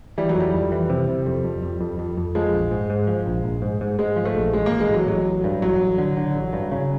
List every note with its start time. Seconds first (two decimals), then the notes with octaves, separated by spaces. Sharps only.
0.18 E3 G3
0.29 F#3
0.36 F2 G3
0.54 F2
0.72 E3
0.90 C3
1.08 C3
1.26 F2
1.44 F2
1.63 F2
1.81 F2
1.99 F2
2.17 F2
2.35 F3 G#3
2.53 A#1
2.71 G#2
2.90 G#2
3.07 F3
3.26 A#1
3.44 A#1
3.62 G#2
3.81 G#2
3.99 G#2 G#3
4.16 F3
4.25 A3
4.35 A#1
4.53 A1 G#3
4.66 A#3
4.72 A1
4.80 G#3
4.89 A1 F#3
5.07 A1 F#3
5.25 A1
5.44 G2
5.62 A1 F#3
5.80 A1
5.98 D3
6.17 D3
6.35 A1
6.53 G2
6.72 C#3